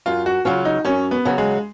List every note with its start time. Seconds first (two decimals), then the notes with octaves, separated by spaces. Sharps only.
0.06 F#2 F4
0.26 F#4
0.45 C#3 F#3 C#4 F4
0.65 D#4
0.85 F#2 C#4
1.11 B3
1.25 C#3 F#3 C#4
1.38 G#3